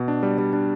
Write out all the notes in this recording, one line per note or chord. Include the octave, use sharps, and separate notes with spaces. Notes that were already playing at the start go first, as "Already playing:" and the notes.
Already playing: B2
D4
G3
G3
D4